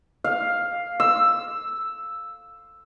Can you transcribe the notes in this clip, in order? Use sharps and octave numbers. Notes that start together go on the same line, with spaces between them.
F5
E6